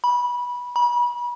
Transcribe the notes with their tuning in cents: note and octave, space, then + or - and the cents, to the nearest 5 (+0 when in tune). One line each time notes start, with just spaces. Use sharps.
B5 -20
B5 -35